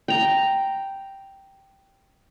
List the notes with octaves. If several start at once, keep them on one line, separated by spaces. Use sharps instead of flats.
G5 A#5